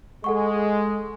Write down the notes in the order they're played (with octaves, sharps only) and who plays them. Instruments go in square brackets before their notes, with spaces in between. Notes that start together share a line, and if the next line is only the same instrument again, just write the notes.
[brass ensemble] G#3 [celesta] A4 F#5 C#6